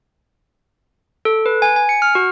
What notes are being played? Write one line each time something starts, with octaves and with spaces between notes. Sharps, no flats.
A4
B4
G#5
G#5
C#7
F6
F#4